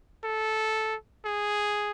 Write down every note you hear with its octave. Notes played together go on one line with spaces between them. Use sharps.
A4
G#4